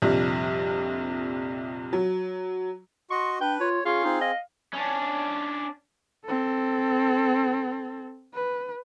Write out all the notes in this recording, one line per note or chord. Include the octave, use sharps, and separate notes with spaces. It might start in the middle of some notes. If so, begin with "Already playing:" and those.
A#1 F2 C3 G3
F#3
F#4 D#5 C6 C#6
D4 B4 G5
F4 C#5
C#4 F4 G#4 C#6
C4 D#4 G#4
D#5 F5
C#4 D4
C4 A4
B4